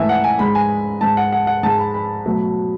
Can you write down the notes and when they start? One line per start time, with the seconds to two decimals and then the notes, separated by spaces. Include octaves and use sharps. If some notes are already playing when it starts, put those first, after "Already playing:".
Already playing: G#2 E3 A3 E5 G#5
0.09 F#5
0.24 G#5
0.39 G#2 G#3 B5
0.55 G#5
1.01 G#2 G#3 A5
1.17 F#5
1.32 F#5
1.47 F#5
1.63 G#2 G#3 A5
1.78 B5
1.94 B5
2.26 B2 F#3 A3